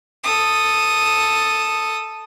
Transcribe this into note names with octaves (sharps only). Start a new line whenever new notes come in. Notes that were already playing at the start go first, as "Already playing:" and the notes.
A4 D#6